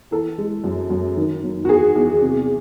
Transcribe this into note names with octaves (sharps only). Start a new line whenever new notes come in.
E3 A4
G#3
F#2
F#2
D#3
F#3
F#4
E2 G#4
E2
C3